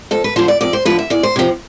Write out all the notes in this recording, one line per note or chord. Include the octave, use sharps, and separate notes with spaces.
F2 A4
B4
D3 F3 C5
D5
F2 D5
C5
D3 F3 B4
E5
E2 D5
C5
C3 F3